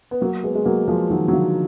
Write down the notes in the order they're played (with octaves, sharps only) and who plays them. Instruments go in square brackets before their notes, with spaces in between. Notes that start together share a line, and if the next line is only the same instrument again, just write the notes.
[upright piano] B3
F#3 A#3
G#3 B3
G#3
F#3 A#3
F3 G#3
D#3 F#3
F#3
D3 F3